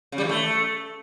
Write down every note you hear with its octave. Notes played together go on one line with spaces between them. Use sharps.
C#3
G3
E3
A3